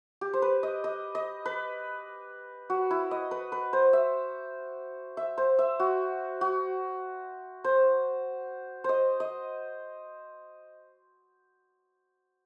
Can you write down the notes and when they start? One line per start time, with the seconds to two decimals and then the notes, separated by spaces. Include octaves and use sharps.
0.21 G4
0.34 C5
0.42 B4
0.63 D#5
0.84 D#5
1.15 D#5
1.46 B4
2.70 F#4
2.91 E4
3.11 D#5
3.31 B4
3.52 B4
3.73 C5
3.93 E5
5.17 E5
5.38 C5
5.59 E5
5.80 F#4
6.41 F#4
7.64 C5
8.84 C5 D#5
9.20 D#5